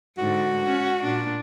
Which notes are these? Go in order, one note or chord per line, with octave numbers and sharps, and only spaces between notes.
G#2 D3 F#4
C#4
A#2 D4